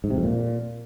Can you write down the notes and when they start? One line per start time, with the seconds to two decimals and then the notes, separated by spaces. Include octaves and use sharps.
0.04 G#2
0.10 C3
0.17 F2
0.23 A#2